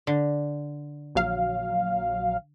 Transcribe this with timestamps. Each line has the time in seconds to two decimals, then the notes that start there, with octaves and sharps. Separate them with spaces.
0.07 D3
1.15 A#1 F#3 F5